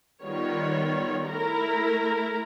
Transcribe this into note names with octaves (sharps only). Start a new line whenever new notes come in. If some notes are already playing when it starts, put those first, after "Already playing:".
D#3 G3 B3 F4 C#5
A3 E4 A#4 A#5